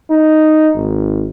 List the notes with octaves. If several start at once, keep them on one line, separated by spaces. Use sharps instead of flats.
D#4
G#1